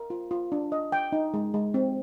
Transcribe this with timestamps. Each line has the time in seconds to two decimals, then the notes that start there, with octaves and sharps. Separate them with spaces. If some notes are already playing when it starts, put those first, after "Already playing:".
Already playing: A#4
0.10 F4
0.31 F4
0.52 D4
0.72 D#5
0.92 G5
1.12 D#4
1.34 G#3
1.54 G#3
1.74 C4